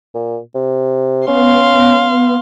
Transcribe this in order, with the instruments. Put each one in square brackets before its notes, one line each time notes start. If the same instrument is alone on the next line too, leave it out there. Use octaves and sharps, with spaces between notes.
[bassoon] A#2
C3
[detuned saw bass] B3 [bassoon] C#4 [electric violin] F5 C6